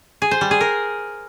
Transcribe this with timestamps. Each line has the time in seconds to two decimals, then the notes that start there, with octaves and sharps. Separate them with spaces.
0.22 G#4
0.31 C5
0.41 G3
0.51 G#4
0.61 A#4